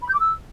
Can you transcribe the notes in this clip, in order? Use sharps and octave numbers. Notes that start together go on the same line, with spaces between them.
B5
G6
D6
E6